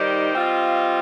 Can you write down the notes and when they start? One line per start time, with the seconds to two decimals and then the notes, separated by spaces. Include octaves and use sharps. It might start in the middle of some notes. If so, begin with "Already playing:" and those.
Already playing: D#3 G3 D#4 G4 C5
0.35 G3 C4 F4 D#5